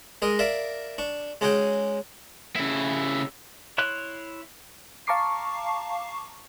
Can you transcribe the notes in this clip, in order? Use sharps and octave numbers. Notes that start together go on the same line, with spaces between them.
G#3 A#4 D#5
A#4 D5 E5 F5
D4 C#6
G#3 C#4 F#4 G#4 C#5 G5
C#3 E4
E4 C#5 C6 F#6
F5 A5 A#5 C#6 D6 C7